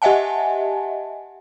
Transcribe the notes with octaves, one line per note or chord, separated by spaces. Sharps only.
G4 D#5 E5 F#5 G#5 A5